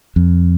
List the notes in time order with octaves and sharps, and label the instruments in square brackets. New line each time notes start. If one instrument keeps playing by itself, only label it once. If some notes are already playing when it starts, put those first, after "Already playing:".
[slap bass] F2